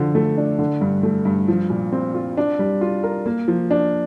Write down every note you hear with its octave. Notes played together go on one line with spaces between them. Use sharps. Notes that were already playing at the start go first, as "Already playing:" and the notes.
Already playing: D3 F3
A3
D4
D3
G2
A3
G2
F3
A#2
C4
F4
D4
G3
F4
A#4
A#3
F3
D4